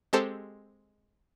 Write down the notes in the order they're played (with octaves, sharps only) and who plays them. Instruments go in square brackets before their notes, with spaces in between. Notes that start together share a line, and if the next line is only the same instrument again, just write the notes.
[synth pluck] G#3 C4 G4 A4 C5